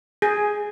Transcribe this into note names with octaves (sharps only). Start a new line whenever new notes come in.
G#4